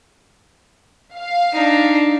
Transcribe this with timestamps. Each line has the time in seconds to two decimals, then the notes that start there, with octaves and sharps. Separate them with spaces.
1.15 F5
1.53 D4 D#4